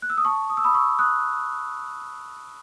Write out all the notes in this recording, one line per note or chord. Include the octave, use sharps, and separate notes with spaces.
F#6
E6
D#6
A5 C#6
D#6
E6
B5 D#6
C#6 E6
D#6 F#6